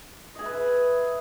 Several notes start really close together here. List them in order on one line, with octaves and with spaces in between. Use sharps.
D#5 G#4 E5 B4